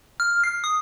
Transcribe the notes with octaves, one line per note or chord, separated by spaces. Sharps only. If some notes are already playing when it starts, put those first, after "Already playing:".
F6
C7
D#6